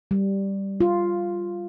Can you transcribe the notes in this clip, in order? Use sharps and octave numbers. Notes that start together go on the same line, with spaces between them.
G3
F4